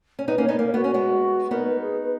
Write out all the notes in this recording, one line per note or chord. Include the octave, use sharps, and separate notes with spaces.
C#4
B3 D#4 B4
A#3 C#4
B3 D#4 C#5
A#3 C#4 A#4
B3 F#4
C#4
G#3 B3
B3 D#4 A#4
B4
G#4
B4